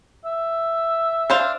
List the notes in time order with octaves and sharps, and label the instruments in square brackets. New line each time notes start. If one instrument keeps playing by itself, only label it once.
[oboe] E5
[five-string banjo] D4 C5 F5